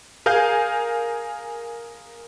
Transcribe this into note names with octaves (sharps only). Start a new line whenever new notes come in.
G#4 A#4 F5 G#5 G6